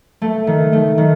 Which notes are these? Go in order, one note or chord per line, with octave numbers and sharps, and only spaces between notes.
A3
D#3
A3
D#3